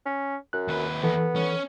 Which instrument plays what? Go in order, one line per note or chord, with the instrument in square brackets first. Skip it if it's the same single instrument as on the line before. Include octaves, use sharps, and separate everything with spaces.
[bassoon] C#4
[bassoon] F#2 [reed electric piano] F#6
[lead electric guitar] D#2 B4
[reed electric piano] E3 A4 [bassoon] B3
[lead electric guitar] C#4